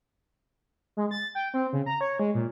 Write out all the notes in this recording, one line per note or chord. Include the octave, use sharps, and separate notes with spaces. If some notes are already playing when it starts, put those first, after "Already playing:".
G#3
A6
G5
C4
C#3
A#5
C#5
G#3
A#2